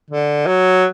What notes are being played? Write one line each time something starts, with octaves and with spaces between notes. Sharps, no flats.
D3
F#3